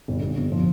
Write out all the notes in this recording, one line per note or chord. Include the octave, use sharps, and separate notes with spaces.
G1
G1
G1
F3